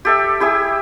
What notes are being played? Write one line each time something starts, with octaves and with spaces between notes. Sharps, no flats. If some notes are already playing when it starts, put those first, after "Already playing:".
G4 A4 E5
E4 G4 G#4 E5